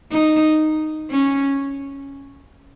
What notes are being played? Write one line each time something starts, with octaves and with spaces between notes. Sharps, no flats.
D#4
C#4